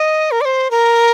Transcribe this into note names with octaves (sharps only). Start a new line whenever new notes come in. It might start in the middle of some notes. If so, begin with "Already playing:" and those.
Already playing: D#5
A#4
D5
C5
A#4